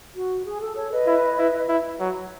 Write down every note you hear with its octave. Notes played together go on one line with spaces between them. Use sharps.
F#4
G#4
A4
A4 C#5
B4 D#5
E4
E4
E4
F#3